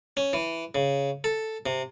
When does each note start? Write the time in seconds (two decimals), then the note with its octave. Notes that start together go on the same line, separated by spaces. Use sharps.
0.17 C#4
0.33 E3
0.75 C#3
1.24 A4
1.66 C3